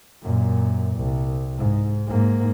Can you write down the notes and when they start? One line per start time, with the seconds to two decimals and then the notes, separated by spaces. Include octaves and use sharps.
0.23 F#2 A#2
0.97 C2
1.58 G#2
2.07 G#2 A#3